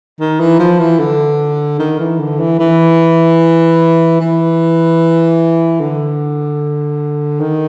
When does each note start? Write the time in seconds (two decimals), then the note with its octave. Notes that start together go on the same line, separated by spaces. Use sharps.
0.20 D#3
0.40 E3
0.59 F3
0.79 E3
1.00 D3
1.79 D#3
1.99 E3
2.20 D3
2.40 E3
2.59 E3
4.21 E3
5.80 D3
7.40 D#3